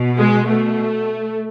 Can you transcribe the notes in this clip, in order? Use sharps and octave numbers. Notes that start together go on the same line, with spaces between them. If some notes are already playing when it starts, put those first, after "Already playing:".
Already playing: B2
G#3
A3